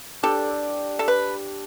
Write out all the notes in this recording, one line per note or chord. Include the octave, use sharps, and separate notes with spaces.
D4 G4 A4 D5
A4
B4